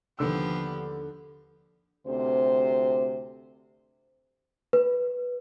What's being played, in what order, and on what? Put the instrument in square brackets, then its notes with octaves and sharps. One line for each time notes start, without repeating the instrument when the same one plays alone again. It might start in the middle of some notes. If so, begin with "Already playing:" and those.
[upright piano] D#2 D3 E6 [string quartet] F3 B3 G4
[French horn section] D2 C3 C5
[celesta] B4